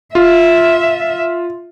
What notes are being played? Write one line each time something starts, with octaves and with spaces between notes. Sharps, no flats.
F4 E5